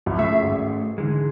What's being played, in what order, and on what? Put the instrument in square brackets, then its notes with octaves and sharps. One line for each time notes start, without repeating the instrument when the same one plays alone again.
[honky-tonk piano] C2 F2
[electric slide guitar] A3 C#4 G#4 [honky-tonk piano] E5
[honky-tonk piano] G#1
[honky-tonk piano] G#2 [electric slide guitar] D3 E3 G#3